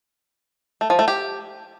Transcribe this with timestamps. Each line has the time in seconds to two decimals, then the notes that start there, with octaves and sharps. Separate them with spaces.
0.81 A3
0.90 F3
0.99 A3
1.08 G4